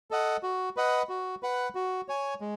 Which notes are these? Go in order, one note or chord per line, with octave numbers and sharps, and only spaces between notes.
A4 D#5 F#5
F#4
B4 D#5 F#5
F#4
B4 F#5
F#4
C#5 G#5
G#3